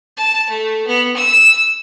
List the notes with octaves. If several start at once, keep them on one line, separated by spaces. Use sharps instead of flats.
A5
A3
B3
E6